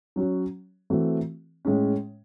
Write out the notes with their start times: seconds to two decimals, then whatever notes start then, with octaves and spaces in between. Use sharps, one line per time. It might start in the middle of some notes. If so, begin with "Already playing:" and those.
0.16 F#3 C#4 F#4
0.90 E3 A3 C4 F#4
1.65 A2 G#3 C#4